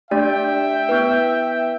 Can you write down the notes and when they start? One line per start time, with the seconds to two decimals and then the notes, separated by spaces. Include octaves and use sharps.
0.11 A3 D4 G4 D5 E5 G5
0.89 B3 E4 B4